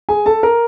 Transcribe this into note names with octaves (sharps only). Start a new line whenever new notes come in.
G#4 G#5
A4 A5
A#4 A#5